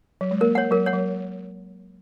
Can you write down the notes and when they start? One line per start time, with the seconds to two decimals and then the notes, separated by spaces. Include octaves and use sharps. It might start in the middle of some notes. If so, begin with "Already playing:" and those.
0.21 F#3
0.31 G#3
0.41 A#3 A#4
0.55 C#5 F#5
0.71 F#3 A#4
0.86 C#5 F#5
0.93 F#3